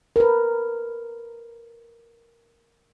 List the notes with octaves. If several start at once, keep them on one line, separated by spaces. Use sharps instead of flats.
A#4 B4